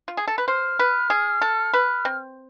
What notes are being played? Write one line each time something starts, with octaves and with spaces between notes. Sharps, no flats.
F4
G#4
A4
B4
C5 F6
B4
G#4
A4
B4
C4